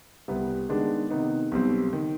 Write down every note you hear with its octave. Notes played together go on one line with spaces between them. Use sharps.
C2 C3 G3 B3
D#3 G#3 B3 D4
C3 D#3 B3 D#4
B1 B2 G3 C4
D#3